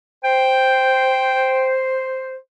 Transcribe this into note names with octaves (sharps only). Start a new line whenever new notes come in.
C5 G5